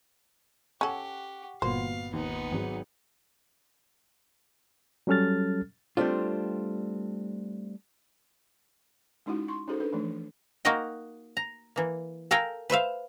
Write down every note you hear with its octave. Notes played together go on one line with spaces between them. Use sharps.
C#4 G4 A4 F#5 C#6
G1 A#2 B3 F#4 C5 F5
D#2 B3 D#4
G#1 F#3 G#3
F#3 G3 C#4 A4 F6 A6
G3 A3 C4 D4 F4
G#3 C#4 D#4 E4 F#4 F#5
C6 C#6
C#4 D#4 F#4 G#4 A4 C5
D4 A4 B4
E3 F3 A3 D4
A#3 D#4 F#4 A#4 D#5 G5
A#5
E3 A#3
A4 A#4 F5 G5 G#5 A#5
B4 C5 E5 F5